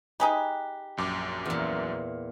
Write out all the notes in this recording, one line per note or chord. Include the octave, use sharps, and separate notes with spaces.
D#4 G4 G#4 B4
A#1 F#2 D6
E2 A#2